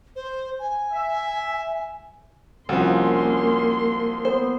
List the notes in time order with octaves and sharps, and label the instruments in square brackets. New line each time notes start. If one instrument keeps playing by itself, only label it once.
[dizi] C5
G#5
[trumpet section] E5
[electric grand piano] C2 F3 [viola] A#3 C6 [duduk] C#4 [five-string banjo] F4 F#4
[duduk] B3 [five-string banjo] C5